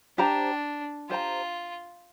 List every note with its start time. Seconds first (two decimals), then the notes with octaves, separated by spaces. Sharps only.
0.18 D4 G4 C5 G5 A#5
1.10 F4 G4 C5 G5 A#5